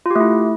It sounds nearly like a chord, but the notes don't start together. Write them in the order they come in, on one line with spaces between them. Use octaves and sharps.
F4 G4 A3 E4